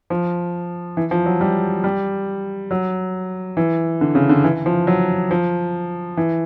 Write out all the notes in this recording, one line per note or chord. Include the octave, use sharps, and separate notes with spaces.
F3
E3
F3
F#3
G3
G3
F#3
E3
D3
C#3
D3
E3
F3
F#3
F3
E3